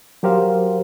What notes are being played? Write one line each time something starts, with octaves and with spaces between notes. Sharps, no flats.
F#3 F#4 G4 A#4 C5 F5